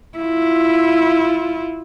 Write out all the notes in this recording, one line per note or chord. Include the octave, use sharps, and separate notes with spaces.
E4 F4